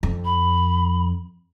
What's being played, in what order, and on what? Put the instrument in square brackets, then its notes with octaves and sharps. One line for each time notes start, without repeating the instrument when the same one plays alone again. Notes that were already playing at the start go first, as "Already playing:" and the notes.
[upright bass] F2
[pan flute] B5